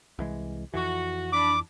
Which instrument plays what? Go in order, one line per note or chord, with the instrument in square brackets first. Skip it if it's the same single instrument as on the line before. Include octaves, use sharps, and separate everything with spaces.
[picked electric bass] C2 E3 G#3
[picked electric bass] F2 E3 [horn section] F#4
[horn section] D4 B5 [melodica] D6